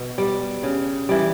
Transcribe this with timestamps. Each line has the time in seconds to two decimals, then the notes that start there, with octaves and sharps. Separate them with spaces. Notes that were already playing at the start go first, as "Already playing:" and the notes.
Already playing: B2
0.18 G3
0.63 C#3
1.09 E3 G3